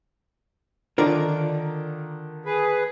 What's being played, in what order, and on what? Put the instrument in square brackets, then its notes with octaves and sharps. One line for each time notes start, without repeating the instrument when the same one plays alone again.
[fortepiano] D3 D#3 [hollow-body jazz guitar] F4 A#4 D5
[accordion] G#4 B4